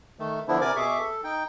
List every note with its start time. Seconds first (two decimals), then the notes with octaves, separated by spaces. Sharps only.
0.19 D#3 A3
0.48 D3 F3 B3 D4 E4
0.61 C3 A#4 D5 G#5 D6
0.76 B2 G#4 E5 C#6 D6
0.98 A4
1.24 D#4 G5